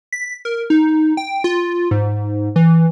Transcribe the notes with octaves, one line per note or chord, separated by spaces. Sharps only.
B6
A#4
D#4
G5
F4
G#2
E3